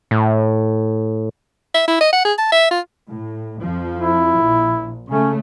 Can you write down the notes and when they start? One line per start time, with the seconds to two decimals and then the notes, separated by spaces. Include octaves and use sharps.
0.11 A2
1.75 E5
1.87 E4
2.01 D#5
2.13 F#5
2.25 G#4
2.38 A5
2.52 E5
2.71 F4
3.09 A2
3.61 F2 F3
3.99 E4
4.41 A#1
5.09 C#3 A3 C#4